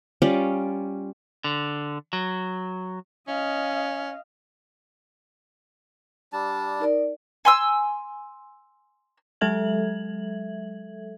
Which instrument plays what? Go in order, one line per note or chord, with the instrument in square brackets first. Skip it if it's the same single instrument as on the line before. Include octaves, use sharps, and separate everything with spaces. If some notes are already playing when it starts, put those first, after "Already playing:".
[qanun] G3 C#4 F4 D5
[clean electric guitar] D3
F#3
[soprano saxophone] C#4 [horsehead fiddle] D#5 F5
[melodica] G3 D4 A5
[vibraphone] D#4 A#4 D5
[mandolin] G#5 C6 E6
[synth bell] F#3 G#3 A4 E5 G#6 F#7